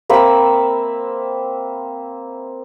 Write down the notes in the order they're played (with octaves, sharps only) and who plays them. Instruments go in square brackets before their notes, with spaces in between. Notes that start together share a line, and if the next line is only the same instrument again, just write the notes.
[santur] A#3 C4 E5 B5